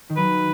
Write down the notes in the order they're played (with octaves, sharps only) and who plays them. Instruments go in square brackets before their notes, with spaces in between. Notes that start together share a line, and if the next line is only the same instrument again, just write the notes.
[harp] D#3
[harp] F#3 [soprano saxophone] B4